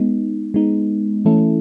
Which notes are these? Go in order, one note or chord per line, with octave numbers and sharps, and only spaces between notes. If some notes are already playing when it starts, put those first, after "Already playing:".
Already playing: G#3 B3 D#4
G#3 B3 D#4
E3 A3 C#4 E4 A4